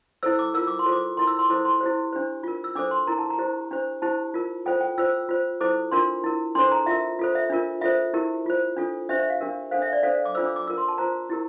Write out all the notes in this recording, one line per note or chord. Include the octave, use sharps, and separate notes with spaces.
E4 A4 C5 E6
D6
F4 A#4 E6
D6
C6
F4 A4 C5
D6
E4 A#4 C6
E6
C6
E4 A4 C5 D6
C6
E4 G4 C5
D4 G4 C5
F4 A#4
E6
D4 A4 C5 D6
C6
E4 A#4 A#5
A5
A#5
E4 G4 C5
D4 G4 C5
E4 G4 C5 A5
F4 A#4
F4 A4 C5 G5
G5
F4 C5 E6
F4 C5
E4 A4 C5 D6
D4 F4 A#4 C6
E4 A#4
D4 A4 C5 C6
A#5
F4 A#4 E5
F4 A4 C5
E5
D4 F4 A#4
F4 A4 C5 E5
E4 G4 A#4
F4 C5
D4 F4 A4
D4 G4 C5 E5
E5
F5
D4 G4 A#4
D4 A4 C5 F5
E5
D5
D4 A4 C5 F5
D6
D4 F4 A4 C5 E6
D6
D6
F4 A#4 E6
C6
A5
F4 C5 A#5
E4 G4 A#4